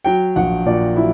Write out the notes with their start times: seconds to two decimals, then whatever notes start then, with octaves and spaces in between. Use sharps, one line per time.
0.04 F#3 G5
0.36 A#1 F#5
0.66 A#2 D5
0.96 F#3 E4